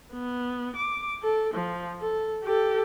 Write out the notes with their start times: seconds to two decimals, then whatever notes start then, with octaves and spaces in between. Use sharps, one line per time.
0.13 B3
0.76 D6
1.23 A4
1.54 F3
2.00 A4
2.43 G4 A4